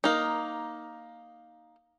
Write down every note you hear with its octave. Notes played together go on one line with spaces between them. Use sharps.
A#3 D#4